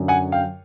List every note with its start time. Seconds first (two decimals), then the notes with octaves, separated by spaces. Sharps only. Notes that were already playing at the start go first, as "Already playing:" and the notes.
Already playing: F#2 D3 F#3
0.08 F#5 G#5
0.32 F5 G5